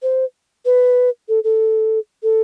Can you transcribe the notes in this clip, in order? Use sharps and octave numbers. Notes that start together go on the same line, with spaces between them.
C5
B4
A4
A4
A4